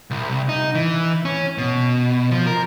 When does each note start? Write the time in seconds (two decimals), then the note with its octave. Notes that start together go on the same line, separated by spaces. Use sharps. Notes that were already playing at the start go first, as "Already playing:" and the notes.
0.11 C2
0.49 D#4
0.75 E3
1.25 C#4
1.58 B2
2.31 F3
2.47 A#4